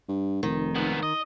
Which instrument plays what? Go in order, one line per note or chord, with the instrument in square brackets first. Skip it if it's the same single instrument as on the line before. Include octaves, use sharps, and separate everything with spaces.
[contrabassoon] G2
[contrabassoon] F1 [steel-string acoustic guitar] D#3
[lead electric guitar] G#2 B3
D#5